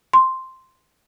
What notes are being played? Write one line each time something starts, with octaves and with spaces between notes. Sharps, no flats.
C6